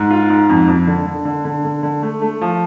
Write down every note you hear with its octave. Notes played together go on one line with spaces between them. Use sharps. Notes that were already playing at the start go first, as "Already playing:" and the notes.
Already playing: G#2
F4
G#2
F2
F2
D3
D3
D3
D3
D3
D3
A3
A3
F3